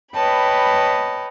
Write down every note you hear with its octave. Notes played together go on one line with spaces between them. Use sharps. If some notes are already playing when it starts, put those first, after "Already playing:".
B4 C#5 D#5 G5 A5 B5